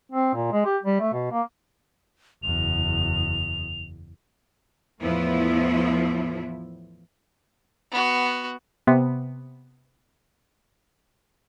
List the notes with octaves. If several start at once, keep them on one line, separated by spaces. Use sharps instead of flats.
C4
A#2
G#3
G4
G3
A3
B2
A#3
F#1 E2 F7
E2 A2 F3 B3 E4
B3 F#4
C3 B3